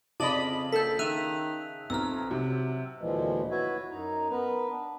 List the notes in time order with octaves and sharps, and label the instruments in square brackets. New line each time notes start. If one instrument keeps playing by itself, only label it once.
[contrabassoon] F2 [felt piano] C#3 [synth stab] D5 D#5 B5 [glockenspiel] A5 F#7
[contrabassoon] A#1 [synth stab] A4 [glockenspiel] G6 B6
[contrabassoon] D#3 [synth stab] E5 [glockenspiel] F#6 D#7 F7
[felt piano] B1 A#5 [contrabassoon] F2 [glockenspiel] E6 F6
[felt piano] C3 [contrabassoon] F#3
[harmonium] D2 A#2 E3 F3 G#3
E4 F#4 B4 C#5 E5
F#2 D#4 A#5
B3 A#4 B4
D4